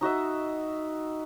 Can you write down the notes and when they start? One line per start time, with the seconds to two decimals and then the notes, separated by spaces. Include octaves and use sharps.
0.01 D#4 F#4 D#5 E5